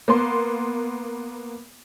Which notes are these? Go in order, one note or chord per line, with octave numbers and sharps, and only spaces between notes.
A#3 B3 C6